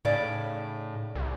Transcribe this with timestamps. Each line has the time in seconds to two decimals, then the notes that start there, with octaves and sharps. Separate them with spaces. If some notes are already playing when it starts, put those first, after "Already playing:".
0.05 A2 C#3 D#4 D5
1.15 C2